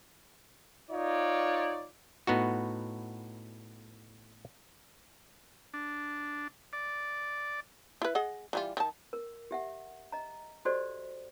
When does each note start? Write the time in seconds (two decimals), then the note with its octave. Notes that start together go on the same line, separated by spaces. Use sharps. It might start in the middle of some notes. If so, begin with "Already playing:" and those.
0.90 D#4 F4 C#5 D5
2.27 A2 B3 D#4 F#4
5.74 D4
6.73 D5
8.02 E4 B4
8.15 G#4 D#5 F#5
8.53 E3 G3 F4
8.77 D#3 A5
9.13 A#4
9.51 G4 E5 F#5
10.12 D#5 A#5
10.65 F#4 G4 A4 C5 D5 D#5